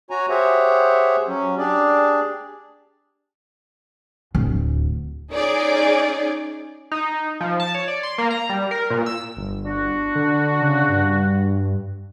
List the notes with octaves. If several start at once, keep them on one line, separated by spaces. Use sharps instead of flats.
F#4 C#5 G#5 A#5
G4 G#4 C5 C#5 E5 F#5
F#3 C#4
D4 G4 G#4 D5
D1 D2
C#4 D#4 G#4 D5
D#4
F3
A5
C#5
D5
C6
A#3
A#5
G3
A#4
A#2
E6
G1
D4 F#4
D3
C#3
G2